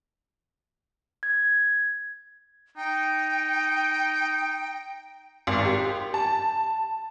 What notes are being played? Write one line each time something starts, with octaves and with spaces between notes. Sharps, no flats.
G#6
D#4 G5
G#1
G4
A5